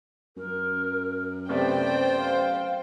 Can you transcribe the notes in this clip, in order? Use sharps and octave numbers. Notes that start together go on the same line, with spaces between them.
F#2 A#4
C3 A3 B3 C5 D5 G5
F5